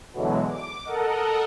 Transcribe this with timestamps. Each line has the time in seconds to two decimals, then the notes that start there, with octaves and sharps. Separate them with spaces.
0.13 B2 D3 E3 F#3 G#3
0.48 D6
0.85 A4 A#4 D#5 F#5